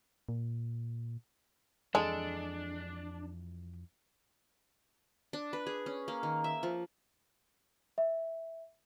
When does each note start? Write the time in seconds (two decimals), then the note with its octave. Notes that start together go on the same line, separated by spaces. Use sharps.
0.29 A#2
1.95 F2 E3 G#3 D4 A4
5.33 D4
5.53 B4
5.66 G#4
5.86 C#4
6.08 A#3
6.23 D#3
6.44 E5
6.63 F3
7.98 E5